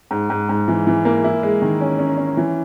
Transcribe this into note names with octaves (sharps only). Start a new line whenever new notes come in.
G#2
G#2
G#2
E3
E3
A#3
E4
G#3
D#3
C#4
C#4
C#4
E3